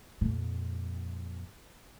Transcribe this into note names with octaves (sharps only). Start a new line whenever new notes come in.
F2 A#2